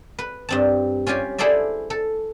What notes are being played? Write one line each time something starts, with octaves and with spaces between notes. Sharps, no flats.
B4
G2 C4 A5
C#4 F4 G4 G#5
E4 G#4 A4 C5 D5 E5
A4